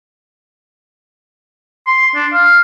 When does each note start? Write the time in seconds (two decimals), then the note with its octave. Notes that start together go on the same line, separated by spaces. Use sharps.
1.87 C6
2.15 D4
2.33 F5